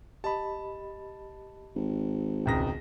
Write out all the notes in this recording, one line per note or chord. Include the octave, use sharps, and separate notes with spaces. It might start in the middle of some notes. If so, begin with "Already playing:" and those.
G4 D#5 A5 B5
G#1
E1 C#2 G5 A#5 D#6 A#6